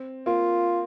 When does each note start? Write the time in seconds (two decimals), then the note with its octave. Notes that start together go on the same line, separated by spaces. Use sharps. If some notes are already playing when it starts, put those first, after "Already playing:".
Already playing: C4
0.26 A#3 F4